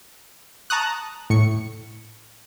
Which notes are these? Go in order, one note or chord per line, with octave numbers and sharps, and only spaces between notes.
A5 A#5 C#6 D#6 F#6
A2 C#6 C#7